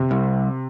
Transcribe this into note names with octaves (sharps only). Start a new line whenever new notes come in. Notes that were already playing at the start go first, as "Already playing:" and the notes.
Already playing: C3
C2